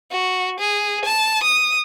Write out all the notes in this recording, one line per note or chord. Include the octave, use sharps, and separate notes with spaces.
F#4
G#4
A5
D#6